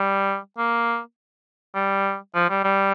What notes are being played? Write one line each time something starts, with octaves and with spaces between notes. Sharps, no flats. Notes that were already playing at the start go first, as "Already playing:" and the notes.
Already playing: G3
A#3
G3
F3
G3
G3